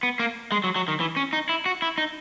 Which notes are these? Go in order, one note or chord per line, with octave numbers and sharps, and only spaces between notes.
B3
A#3
G#3
F#3
F#3
D#3
E3
C#4
D#4
E4
F#4
E4
D#4